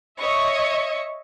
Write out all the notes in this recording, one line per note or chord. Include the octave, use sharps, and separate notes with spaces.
C#5 D#5 E5 C#6